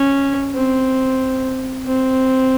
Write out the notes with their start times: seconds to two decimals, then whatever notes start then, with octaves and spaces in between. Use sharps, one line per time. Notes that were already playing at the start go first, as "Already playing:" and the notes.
Already playing: C#4
0.54 C4
1.86 C4